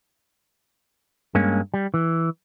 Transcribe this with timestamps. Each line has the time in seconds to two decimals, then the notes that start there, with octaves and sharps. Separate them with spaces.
1.35 G2 G#3 A#3 C#4
1.74 G3
1.94 E3